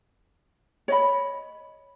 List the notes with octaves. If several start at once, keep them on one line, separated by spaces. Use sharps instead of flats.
C#5 D#5 B5